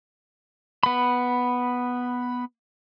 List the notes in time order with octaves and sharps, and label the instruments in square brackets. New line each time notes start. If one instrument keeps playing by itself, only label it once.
[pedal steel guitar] B3 B5